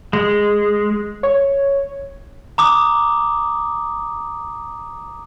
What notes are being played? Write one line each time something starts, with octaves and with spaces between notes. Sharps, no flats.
G#3
C#5
A#5 D6 D#6